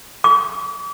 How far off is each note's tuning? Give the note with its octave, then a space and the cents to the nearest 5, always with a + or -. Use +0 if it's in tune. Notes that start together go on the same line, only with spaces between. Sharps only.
D6 -45